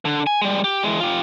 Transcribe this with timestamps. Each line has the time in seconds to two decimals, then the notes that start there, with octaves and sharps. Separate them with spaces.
0.05 D3
0.27 G#5
0.42 G3 G#3
0.64 G4
0.83 E3 G#3
1.00 F4 G4